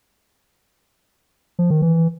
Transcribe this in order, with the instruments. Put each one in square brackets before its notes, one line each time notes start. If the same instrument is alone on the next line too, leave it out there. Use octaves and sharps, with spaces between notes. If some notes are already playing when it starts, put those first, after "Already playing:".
[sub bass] F3
D#3
E3